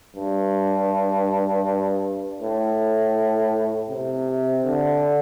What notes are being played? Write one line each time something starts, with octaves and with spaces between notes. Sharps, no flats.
G2
A2
C3
D3